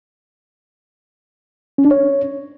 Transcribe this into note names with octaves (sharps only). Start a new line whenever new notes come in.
C#4
D4
C#5